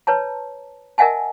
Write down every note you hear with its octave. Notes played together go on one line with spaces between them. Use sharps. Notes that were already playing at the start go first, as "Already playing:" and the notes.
B4 C#5 A5 A#5
A#4 D#5 E5 F#5 G#5 A5